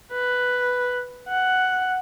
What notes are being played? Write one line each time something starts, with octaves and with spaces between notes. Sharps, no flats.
B4
F#5